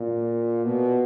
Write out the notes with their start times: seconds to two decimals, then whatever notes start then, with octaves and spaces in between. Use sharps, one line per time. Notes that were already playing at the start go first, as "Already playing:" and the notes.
Already playing: A#2
0.64 B2